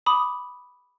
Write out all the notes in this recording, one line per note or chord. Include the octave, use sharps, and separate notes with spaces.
B5 D6 D#6